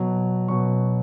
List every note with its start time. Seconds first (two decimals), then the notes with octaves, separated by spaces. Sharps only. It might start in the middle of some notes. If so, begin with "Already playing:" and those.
Already playing: B2 F#3
0.48 B2 F#3 C#6